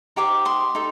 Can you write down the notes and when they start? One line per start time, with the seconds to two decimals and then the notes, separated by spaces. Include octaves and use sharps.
0.16 D#4 G4 C5 A#5 D6
0.45 C6 D#6
0.75 D#4 A4